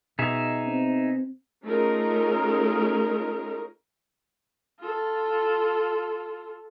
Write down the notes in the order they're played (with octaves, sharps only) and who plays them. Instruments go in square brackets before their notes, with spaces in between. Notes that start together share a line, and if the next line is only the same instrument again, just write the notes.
[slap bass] B2 [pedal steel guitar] D#4 G#4 E5
[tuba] C4
[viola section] A3 C#4 D#4 F4 G#4 A#4
[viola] F4 A4